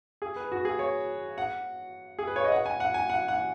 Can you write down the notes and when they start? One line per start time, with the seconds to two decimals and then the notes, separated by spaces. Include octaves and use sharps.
0.22 G#4
0.36 B4
0.52 F#4
0.65 G#4
0.79 C#5
1.38 F#5
2.19 G#4
2.27 B4
2.36 C#5
2.44 D#5
2.52 F#5
2.66 G#5
2.80 F#5
2.94 G#5
3.10 F#5
3.28 F#5